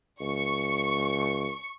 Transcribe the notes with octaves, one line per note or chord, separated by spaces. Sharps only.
C#2 C#6 C#7